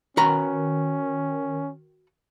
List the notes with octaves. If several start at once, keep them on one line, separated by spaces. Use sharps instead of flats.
D#3 C#4 F#4 B4 A#5